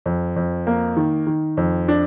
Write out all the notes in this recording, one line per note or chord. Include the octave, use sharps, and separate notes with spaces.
F2
F2
A#3
D#3
D#3
F2
D4